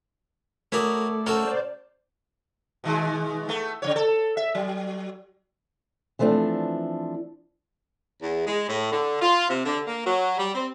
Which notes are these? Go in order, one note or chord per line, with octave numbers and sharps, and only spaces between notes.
A3 C#4 E4 F#4 A#4 D5 D#6
C#4 F#4 A4 A#4 C5 D5
B2 D#3 G#3
A3 B3
C#3 E3 C#5
A4
E5
F#3
E3 F3 A3 C4 D4
E2
G#3
A2
D3
F4
C3
D3
A#3
F#3
G3
C4